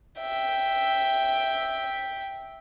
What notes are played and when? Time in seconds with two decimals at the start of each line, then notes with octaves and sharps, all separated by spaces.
0.19 E5 G5